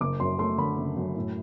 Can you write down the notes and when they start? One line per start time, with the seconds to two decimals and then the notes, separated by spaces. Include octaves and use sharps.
0.01 F#1 D6
0.20 F#2 C6
0.39 A3 C6
0.58 D3 B5
0.78 F#1
0.96 F#2
1.16 A2